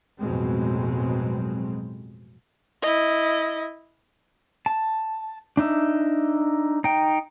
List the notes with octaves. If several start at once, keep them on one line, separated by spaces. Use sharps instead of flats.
A1 F2 B2 F#3 G#3 C4
E4 D#5
A5
D4 D#4 E5
D#4 G5